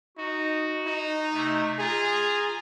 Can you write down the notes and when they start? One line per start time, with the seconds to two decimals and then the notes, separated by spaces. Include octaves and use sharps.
0.17 D#4 F#4
0.87 D#4
1.33 C3 A3
1.79 F4 G#4 A#5